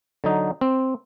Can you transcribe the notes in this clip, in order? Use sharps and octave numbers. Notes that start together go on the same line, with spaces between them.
D3 F#3 D#4
C4